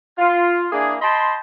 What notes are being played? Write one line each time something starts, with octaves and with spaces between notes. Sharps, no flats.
F4
A#3 D4 E4 G#4
D#5 G5 A5 B5 C6